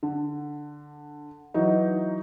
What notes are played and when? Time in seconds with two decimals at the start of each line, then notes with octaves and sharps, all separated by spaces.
0.03 D3
1.54 E3 F#3 D#4